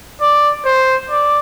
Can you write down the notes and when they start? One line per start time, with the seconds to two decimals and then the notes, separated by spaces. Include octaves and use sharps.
0.21 D5
0.65 C5
1.10 D5